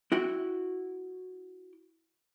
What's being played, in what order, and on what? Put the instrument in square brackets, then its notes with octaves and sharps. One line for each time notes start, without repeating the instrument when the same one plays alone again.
[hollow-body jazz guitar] E4 F#4 G5